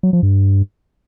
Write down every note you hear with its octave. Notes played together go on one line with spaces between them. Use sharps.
F#3
F3
G2